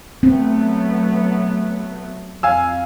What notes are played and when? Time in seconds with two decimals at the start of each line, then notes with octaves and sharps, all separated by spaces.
0.23 F#3 A3 B3 C4
2.43 F2 F5 G#5 E6